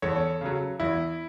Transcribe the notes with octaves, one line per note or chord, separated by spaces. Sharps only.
E2 A4 C#5
C#3 F#3
E2 E4